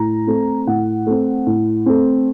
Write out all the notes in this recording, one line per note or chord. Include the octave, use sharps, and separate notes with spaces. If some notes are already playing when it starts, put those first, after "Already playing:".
Already playing: A2 A#5
A3 C4
A2 F#5
A3 C4
A2
A3 C4